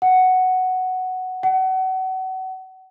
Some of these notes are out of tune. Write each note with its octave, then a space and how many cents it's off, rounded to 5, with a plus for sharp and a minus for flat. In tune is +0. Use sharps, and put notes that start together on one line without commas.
F#5 +5
F#5 +30